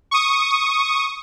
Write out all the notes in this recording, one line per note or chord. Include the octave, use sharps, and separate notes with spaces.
C#6 D#6